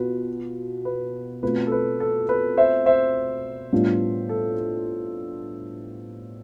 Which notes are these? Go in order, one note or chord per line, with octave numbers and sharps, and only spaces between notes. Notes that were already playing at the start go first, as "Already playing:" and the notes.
Already playing: B2 F4 B4
B4
B2 A3 C4 F4 B4
A4
B4
A4
B4
C5 E5
C5 E5
A2 G3 B3 D4 F4
A4